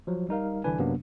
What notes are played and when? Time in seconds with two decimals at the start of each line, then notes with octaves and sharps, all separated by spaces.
0.07 F3 F#3
0.29 G3 D#4 A#4 F5
0.64 C2 D3 E3 D4 B4 G#5
0.79 F#2 C3 F#3 A#3 B3 D4